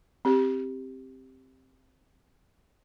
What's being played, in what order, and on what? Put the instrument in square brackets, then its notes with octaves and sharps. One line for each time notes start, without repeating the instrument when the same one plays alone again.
[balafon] C4 G4